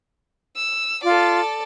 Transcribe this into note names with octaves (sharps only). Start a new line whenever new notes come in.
E6
F4 A4 D5